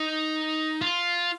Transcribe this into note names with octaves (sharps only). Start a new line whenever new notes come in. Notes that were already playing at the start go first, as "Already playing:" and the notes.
Already playing: D#4
F4